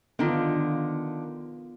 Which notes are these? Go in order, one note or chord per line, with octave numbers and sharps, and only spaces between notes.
D3 D#3 B3 F4